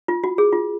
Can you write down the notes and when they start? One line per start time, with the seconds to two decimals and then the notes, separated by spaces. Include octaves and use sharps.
0.08 F4
0.24 F#4
0.38 G#4
0.53 F4